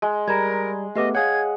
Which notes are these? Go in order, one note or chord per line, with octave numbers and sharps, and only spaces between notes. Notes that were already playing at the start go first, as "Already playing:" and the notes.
G#3
G3 A#4 A#5 B5 G#6
A3 B3 G4 B4 D#5 D6
G#4 C#5 F5 F#5 G#6